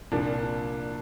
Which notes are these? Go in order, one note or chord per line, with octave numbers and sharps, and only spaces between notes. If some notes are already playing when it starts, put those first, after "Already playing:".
C2 A#2 F3 A#3 D4